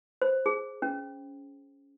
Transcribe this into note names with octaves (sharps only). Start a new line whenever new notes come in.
C5
G#4
C#4